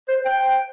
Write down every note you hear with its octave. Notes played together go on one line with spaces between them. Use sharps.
C5
G5